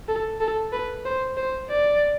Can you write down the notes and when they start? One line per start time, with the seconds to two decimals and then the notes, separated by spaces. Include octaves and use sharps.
0.08 A4
0.41 A4
0.72 B4
1.05 C5
1.37 C5
1.70 D5